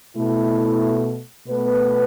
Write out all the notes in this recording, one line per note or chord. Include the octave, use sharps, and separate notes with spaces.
B2 A3 E4
B2 A3 B3 B4